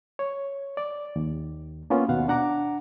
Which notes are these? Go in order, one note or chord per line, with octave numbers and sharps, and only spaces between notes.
C#5
D5
D#2
A#3 B3 C#4 F4
D#2 B2 F5 F#5
D4 F#5 A#5 D6